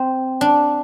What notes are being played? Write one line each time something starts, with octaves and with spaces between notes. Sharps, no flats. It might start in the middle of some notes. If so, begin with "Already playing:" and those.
Already playing: C4
D4